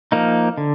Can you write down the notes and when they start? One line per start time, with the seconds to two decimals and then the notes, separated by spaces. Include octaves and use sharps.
0.12 F3 A#3 D#4
0.58 D3